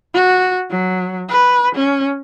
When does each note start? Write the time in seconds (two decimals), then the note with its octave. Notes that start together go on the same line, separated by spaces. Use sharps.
0.14 F#4
0.70 F#3
1.29 B4
1.75 C#4